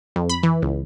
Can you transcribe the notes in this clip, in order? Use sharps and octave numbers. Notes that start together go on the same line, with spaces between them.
F2
B5
E3
C#2